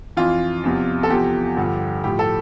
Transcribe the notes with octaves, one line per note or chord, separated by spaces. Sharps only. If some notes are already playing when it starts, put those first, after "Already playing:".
F2 E3 F4
E2 C3 F3
A4
E2 C3 F3 G4
G2 D3 F3
A2 F3 G4
A4